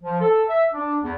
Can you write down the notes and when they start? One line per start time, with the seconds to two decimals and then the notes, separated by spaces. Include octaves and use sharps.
0.02 F3
0.21 A4
0.49 E5
0.73 D4
1.03 E2